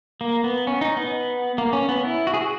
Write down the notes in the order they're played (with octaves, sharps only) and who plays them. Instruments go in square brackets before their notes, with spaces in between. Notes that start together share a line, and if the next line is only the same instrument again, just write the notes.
[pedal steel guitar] A#3
B3
C#4
D#4
B3
A#3
C#4
B3
E4
F#4
G#4
F#4